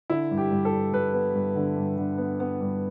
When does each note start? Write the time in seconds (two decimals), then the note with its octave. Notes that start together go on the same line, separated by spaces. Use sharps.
0.10 D3 E4
0.31 G2
0.38 G4
0.51 G2
0.65 A4
0.73 G2
0.93 G2 B4
1.13 B3
1.34 G2
1.56 D3
1.76 G2
1.98 D3
2.18 B3
2.40 B3
2.60 G2